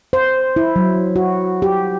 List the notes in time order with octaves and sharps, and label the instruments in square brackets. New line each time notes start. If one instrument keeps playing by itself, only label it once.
[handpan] C5
E4
F#3
F#4
G4